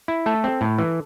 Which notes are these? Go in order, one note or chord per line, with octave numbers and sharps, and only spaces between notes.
E4
A3 A4
C4
A2
E3